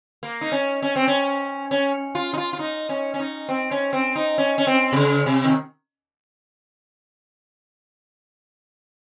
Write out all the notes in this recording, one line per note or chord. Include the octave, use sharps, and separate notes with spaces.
A#3
D#4
C#4
C#4
C4
C#4
C#4
F4
D#4
F4
F4
D#4
C#4
C#4
D#4
C4
C#4
C4
D#4
C#4
C#4
C4
C3
C#3
C3
D#3